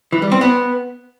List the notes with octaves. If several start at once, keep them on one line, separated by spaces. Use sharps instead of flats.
E3
G3
C4
B3